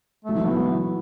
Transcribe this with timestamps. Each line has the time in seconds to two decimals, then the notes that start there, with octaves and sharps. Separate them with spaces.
0.25 F#3 A3
0.35 E3
0.46 E3 B3